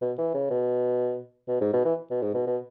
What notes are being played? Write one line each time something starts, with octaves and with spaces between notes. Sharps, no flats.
B2
E3
C#3
B2
B2
G#2
B2
E3
B2
G#2
B2
B2